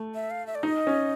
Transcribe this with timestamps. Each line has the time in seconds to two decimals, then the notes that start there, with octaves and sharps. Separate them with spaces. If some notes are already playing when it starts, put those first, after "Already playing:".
Already playing: A3
0.15 E5
0.31 F5
0.47 E5
0.55 D5
0.63 D#4 D#5
0.87 C#4